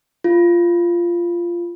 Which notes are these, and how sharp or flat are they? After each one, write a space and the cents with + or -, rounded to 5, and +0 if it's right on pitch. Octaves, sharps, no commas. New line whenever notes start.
F4 -15